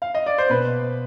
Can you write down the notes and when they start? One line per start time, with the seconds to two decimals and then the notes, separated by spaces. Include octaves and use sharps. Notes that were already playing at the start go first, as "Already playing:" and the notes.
0.02 F5
0.15 D#5
0.26 D5
0.38 C5
0.50 B2 B4